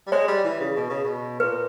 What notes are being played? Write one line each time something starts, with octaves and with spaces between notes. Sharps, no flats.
G3
G#3 C#5
G3
E3
C#3
B2
C#3
B2
A#2 B4